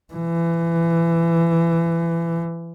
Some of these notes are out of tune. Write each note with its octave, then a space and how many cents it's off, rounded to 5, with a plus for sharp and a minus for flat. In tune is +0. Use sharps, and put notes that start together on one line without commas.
E3 +25